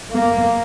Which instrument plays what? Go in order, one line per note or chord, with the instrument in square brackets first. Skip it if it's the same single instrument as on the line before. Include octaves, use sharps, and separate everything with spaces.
[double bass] A#3